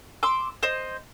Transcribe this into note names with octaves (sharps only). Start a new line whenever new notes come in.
C6 D6 E6
C5 D#5